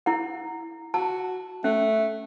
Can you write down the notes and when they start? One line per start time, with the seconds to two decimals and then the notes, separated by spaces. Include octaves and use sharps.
0.06 E4 F#5
0.94 F#4 A5
1.64 A3 C#4